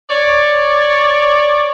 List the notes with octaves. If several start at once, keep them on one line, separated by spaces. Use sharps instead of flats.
C#5 D5